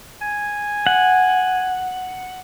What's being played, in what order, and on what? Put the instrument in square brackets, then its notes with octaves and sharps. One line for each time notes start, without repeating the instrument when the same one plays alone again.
[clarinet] G#5
[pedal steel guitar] F#5